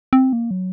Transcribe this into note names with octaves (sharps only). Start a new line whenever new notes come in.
C4
A#3
F#3